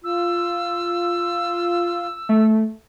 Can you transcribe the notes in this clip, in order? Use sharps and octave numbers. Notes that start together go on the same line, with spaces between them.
F4 E6
A3